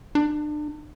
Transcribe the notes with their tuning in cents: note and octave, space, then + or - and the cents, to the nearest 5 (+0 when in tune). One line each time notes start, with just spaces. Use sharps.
D4 +35